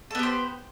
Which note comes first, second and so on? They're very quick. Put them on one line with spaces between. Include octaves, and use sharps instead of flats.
A4 B3 G4 C5